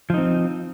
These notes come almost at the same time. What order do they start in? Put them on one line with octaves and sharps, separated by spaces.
F3 D#4 C4